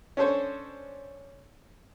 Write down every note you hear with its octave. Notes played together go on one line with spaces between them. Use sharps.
C#4 D4 A4 C5 C#5